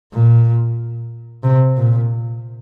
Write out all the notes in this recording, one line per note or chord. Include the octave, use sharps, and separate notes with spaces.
A#2
C3
A#2